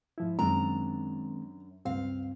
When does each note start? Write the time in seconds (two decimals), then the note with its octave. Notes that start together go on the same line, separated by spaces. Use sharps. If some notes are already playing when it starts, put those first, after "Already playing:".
0.18 G#2 F3 E4
0.39 F#2 D#3 G#3 C4 D4 A#5
1.86 C#2 G2 C4 F5